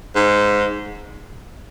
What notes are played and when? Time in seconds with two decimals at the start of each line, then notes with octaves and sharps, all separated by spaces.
0.16 G#2